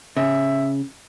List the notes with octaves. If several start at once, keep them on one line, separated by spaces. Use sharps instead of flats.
C#3 E5